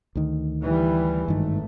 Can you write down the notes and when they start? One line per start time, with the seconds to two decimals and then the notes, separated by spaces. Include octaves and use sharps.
0.15 D2 D#3
0.63 E3 G3
1.28 G#1 G2 D#3 A3